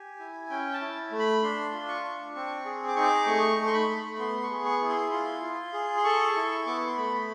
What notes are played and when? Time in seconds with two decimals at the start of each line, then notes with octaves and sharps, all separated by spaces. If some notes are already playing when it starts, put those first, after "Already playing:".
Already playing: G4 G#5
0.19 E4
0.50 C#4 G5
0.74 A5
0.81 E4
1.11 A3
1.19 B5
1.43 D4 C6
1.73 F4
1.89 C#6
2.04 D4
2.35 C4 C#6
2.66 G#4
2.88 D6
2.96 D#4 C#6
3.02 D6
3.27 A3 C#6
3.58 A3
3.67 C6
3.74 B5
3.89 A3
4.16 B5
4.19 B3 C6
4.43 C#6
4.51 G#4
4.65 C#6
4.81 E4
4.89 C6
5.12 F4 C6
5.42 F4
5.73 G#4
5.97 C6
6.04 A4 C#6
6.36 E4
6.66 B3 D6
6.77 C#6
6.87 C6
6.97 A3 B5